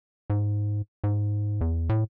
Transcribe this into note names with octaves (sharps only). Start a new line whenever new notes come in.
G#2
G#2
E2
A2